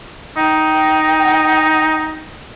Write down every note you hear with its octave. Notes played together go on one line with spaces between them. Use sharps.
D#4 G5